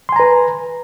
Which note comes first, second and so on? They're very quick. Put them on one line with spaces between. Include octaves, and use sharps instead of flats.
C6 G#5 A#5 B4